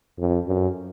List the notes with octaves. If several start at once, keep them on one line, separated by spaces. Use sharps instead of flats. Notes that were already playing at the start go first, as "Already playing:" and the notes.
F2
F#2